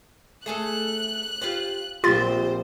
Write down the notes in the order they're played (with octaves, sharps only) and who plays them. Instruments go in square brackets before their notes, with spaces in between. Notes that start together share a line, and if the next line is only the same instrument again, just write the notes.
[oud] A3 G#4 A4 [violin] F#6
[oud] F4 G4 C5
[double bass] A#1 F3 [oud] C4 G4 [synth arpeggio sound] F4 A6 [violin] C5